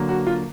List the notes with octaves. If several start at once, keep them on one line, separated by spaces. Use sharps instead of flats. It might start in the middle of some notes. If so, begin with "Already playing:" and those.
Already playing: D3 F#3 A#3
F#4
F4